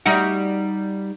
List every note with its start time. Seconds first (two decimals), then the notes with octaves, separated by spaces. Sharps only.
0.06 G3 D#4 F#4